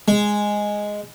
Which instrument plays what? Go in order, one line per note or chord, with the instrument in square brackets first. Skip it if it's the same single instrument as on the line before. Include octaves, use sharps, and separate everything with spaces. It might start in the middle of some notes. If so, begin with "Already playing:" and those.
[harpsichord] G#3